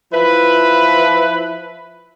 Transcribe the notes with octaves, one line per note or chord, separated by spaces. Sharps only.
F3 E4 B4